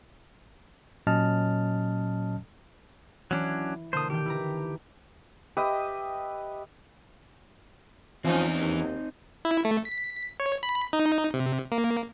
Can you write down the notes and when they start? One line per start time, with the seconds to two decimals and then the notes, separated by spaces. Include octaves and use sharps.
1.07 A#2 F#3 C#4 D#5 A5 F6
3.31 E3 F#3 C#4 D4
3.93 B2 D3 A#3 C5 D#6
4.10 D#3 G4 G5
4.26 E4 B4 A#5
5.57 G4 B4 D#5 E5
8.25 E2 E3 F3 C4 C#4 D#4
8.60 D#2
9.45 E4
9.65 A3
9.85 B6
10.40 C#5
10.63 B5
10.93 D#4
11.34 C3
11.72 A#3